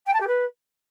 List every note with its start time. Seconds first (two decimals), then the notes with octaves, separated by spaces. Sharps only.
0.06 G5
0.13 A5
0.20 G4
0.27 B4